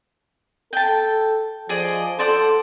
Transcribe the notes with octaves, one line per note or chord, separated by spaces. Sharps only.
A4 G5 A5
F3 G#4 D5 D#5
A4 C5 D5 F#5